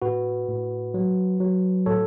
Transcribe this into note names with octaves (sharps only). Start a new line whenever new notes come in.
A2 F#4 B4
A2
F#3
F#3
A2 A4 C#5